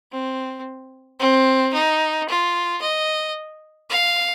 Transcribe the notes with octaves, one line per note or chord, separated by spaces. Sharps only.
C4
C4
D#4
F4
D#5
F5